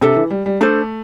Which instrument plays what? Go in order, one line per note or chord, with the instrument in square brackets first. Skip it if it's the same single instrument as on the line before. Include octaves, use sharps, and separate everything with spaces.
[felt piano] C3 [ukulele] D4 A4 E5
[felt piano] E3
G3
G3
[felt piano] A3 [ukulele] D4 A4 C5